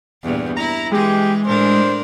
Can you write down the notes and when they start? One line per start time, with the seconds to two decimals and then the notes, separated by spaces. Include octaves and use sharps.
0.23 E2 G2 A#2
0.57 E4 A#5
0.92 E3 G#3 G4 G#4
1.47 A2 D4 A#4 C5